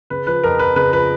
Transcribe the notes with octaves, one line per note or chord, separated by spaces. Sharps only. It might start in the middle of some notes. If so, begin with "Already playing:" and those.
C#3 B4
F3 B4
F2 A#4
F2 B4
C#3 B4
F3 B4